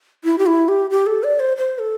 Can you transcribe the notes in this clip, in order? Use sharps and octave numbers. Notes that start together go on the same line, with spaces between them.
E4
G4
E4
G4
G4
A4
D5
C5
C5
A4